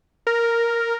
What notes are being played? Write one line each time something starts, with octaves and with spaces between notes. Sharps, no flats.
A#4